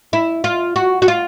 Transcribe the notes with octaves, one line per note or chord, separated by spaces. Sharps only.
E4
F4
F#4
F#4
F4